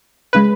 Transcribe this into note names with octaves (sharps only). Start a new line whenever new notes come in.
C#3 G#3 B4